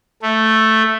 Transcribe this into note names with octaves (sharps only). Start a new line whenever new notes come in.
A3